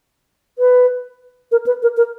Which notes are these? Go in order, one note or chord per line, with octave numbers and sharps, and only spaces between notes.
B4
A#4
B4
A#4
A#4